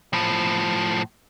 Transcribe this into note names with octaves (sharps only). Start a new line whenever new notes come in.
A2 F3